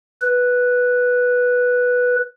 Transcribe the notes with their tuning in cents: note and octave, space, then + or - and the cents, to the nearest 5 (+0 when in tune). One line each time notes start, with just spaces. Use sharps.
B4 -5